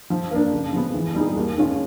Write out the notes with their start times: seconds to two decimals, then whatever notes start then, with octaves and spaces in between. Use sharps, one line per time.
0.10 F3
0.31 A#3 D4
0.52 C#3
0.73 F3 G#3 B3
0.94 E3
1.15 G3 B3 D#4 G#4
1.36 D#2
1.57 D#3 G#3 C#4 F4